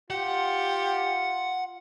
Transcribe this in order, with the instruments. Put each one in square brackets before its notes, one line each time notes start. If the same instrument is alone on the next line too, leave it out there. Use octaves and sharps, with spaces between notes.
[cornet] F4 [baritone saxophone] G4 [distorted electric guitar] F#5